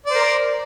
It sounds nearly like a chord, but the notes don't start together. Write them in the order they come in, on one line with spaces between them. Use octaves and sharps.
D5 C5 A#4